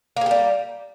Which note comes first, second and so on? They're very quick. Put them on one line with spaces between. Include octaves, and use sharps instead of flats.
A#3 G#4 G4 G3